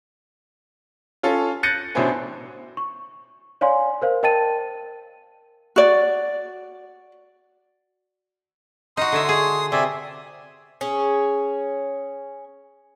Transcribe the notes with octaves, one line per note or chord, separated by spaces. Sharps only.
C#4 F4 A4
F#6 G6 A6 A#6 C#7 D#7
A1 B2 D4 E4 C5 G#5
C#6
C#5 D5 F5 G#5 C6
A#4 C5 F5
A#4 D#5 G5 A5 A6 D#7
F#4 D5
D#4 F#4 C6 D#6
D3 C#5 E5
G#4
C3 D5 E5 G#5
C#4 G#4